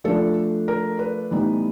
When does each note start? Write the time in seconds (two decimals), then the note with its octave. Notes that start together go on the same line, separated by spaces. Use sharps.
0.04 F3 A3 D4 A4
0.68 A#4
0.99 B4
1.31 A2 E3 G3 B3 D#4